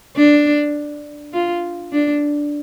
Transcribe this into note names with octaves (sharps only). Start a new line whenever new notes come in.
D4
F4
D4